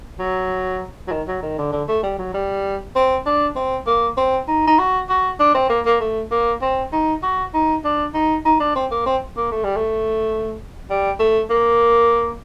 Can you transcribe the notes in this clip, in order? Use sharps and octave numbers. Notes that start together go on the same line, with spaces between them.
F#3
F#3
D#3
F#3
D#3
D3
D3
A3
G3
F#3
G3
C4
D4
C4
A#3
C4
D#4
D#4
F#4
F#4
D4
C4
A#3
A#3
A3
A#3
C4
D#4
F#4
D#4
D4
D#4
D#4
D4
C4
A#3
C4
A#3
A3
G3
A3
G3
A3
A#3